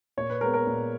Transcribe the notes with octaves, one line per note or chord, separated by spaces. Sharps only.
A#2 C#5
B4
G#3 B3 A#4
A#4
A#2